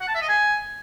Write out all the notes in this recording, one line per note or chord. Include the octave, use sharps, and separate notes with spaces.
F#5
A5
E5
D#5
G#5